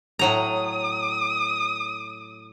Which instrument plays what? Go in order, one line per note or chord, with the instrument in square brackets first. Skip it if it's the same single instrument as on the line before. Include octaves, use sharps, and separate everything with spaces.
[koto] A2 F#3 A#5 [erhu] D#6